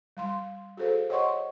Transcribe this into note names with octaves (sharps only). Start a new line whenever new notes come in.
G3 F5 C6
F#4 G#4 A4 C5 F5
C5 C#5 D#5 F#5 C6 C#6